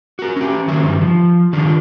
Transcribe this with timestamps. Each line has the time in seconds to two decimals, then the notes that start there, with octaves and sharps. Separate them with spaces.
0.19 F#4 A#4
0.36 C#4 G4
0.68 D#3 F#3 C#4 E5
0.83 G2 D#3 G3
1.01 F3
1.53 D3 D#3 G3 D4 F4